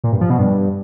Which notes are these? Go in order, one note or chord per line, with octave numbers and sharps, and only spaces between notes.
A#2
G2
F3
B2
G2